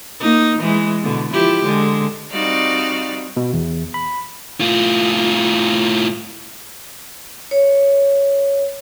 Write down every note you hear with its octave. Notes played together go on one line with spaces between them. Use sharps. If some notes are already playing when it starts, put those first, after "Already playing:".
A#3 D#4
E3 G#3
B2 D3
F3 E4 G4
D3 G#3
G3 C4 D#4 F#4 D5 F5
B2
E2
B5
A2 F4
C#5